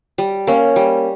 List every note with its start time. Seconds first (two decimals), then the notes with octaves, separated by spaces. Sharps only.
0.18 G3
0.47 A#3 C#4
0.76 G3